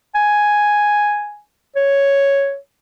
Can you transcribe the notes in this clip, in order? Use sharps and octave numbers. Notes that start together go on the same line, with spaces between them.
G#5
C#5